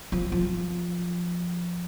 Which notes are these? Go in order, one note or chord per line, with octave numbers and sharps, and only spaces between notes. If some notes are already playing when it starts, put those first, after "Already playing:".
F3
F3